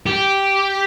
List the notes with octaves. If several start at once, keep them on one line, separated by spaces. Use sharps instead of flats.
G4